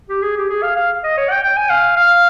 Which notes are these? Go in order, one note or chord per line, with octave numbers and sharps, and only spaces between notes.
G4
G#4
G4
G#4
F5
F5
D#5
C#5
G5
G5
G#5
F5
F5